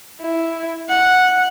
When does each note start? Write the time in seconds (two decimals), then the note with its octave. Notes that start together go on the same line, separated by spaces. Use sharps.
0.21 E4
0.89 F#5